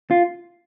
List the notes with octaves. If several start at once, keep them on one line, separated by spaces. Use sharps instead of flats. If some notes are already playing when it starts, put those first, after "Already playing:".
F4